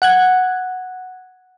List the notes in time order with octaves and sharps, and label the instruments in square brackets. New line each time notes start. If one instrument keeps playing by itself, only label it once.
[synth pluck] F#5 F#6 G#6